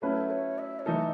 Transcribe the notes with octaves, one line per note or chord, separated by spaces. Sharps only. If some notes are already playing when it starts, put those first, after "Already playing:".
F#3 A3 C#4 E4 A4 B4
C#5
E5
C#5
E3 A3 D#4 A4 D#5